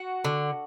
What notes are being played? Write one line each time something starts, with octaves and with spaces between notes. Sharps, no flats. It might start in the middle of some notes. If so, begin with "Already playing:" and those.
Already playing: F#4
D3